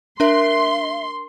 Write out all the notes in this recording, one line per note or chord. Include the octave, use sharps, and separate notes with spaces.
D4 A#4 E5 C6